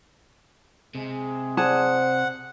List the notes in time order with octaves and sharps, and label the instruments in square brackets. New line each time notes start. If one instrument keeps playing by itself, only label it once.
[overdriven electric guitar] C3 [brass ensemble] G#3 G#4
[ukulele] G#4 D5 A5 [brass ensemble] C5 [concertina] F#5